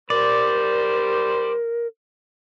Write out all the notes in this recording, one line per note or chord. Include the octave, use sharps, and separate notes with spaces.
G3 A#4 C5 D5